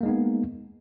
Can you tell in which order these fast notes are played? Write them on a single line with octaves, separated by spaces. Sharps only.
A#3 G#3 D#4 B3